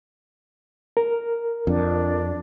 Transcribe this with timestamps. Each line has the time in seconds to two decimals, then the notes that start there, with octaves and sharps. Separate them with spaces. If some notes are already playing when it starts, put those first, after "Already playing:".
0.97 A#4
1.67 F2 D4